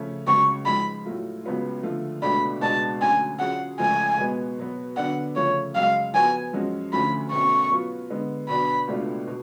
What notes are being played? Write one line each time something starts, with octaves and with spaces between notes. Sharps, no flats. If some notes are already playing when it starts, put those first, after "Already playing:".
Already playing: C#3 F3 A3 C#4
C#2 C#3 F#3 C#6
G#2 F3 G#3 B5
A2 F#3 A3 F4
C#2 C#3 F#3 B3 F4
D3 F3 A3 F4
C#2 B2 A3 D4 B5
C#2 B2 G#3 D4 A5
D2 D3 F#3 C#4 G#5
F#3 C#4 F4 G#4 F#5
C#2 C#3 F3 A3 F4 G#5
B2 G#3 B3
B2 F#3 B3
D3 F#3 B3 D4 F#5
C#3 F3 A3 F4 C#5
F#2 C#3 G#3 F5
F3 B3 F#4 G#5
F#2 F3 G#3 C#4 F#4
D2 D3 F3 A3 C#4 B5
B2 A3 C#4 C#6
F#3 B3 F4
D3 G#3 B3
B2 F#3 B3 D4 B5
C#2 B2 A3 D4 F4
B2